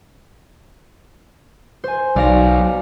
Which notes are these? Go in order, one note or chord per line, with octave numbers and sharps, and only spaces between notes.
C5 G#5
B1 D5 F5 A#6